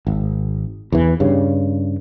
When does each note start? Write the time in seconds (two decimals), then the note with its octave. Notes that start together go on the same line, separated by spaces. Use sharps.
0.07 G#1
0.92 E2 E3
1.20 G2 C#3